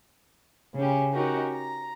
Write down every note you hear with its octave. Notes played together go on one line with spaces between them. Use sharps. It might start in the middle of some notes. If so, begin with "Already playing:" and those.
C#3 C#4 G4
C#4 D#4 F#4 G4 A#4
A#5